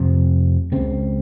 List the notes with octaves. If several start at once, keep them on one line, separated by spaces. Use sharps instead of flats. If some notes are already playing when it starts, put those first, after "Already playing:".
Already playing: F2 C3
C#2 C#3 C4